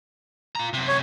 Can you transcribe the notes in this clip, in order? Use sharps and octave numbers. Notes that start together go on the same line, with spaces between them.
F4 A#5
F#2 C3
C#5